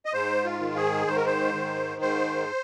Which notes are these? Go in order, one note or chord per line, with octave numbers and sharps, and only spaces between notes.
D#5
G#2 C5
F4
D#3
G#4
G#2 C5
A#4
C5
D#3
G#2 C5